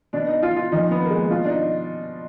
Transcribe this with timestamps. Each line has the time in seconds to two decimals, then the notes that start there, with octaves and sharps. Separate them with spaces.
0.13 B2 D4
0.27 D#4
0.43 F4
0.56 F4
0.72 A#2 F3 D#4
0.91 B3
1.04 A#3
1.10 G#3
1.30 B2 F4
1.45 D4
1.50 D#4